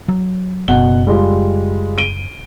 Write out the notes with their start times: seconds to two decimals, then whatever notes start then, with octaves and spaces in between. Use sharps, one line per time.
0.08 F#3
0.68 F#1 B2 F#5 G7
1.07 G3 G#3 F4
1.98 D7 D#7 G7